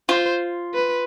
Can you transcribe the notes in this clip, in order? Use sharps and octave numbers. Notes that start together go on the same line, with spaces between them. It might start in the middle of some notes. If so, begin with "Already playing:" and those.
F4 C5
B4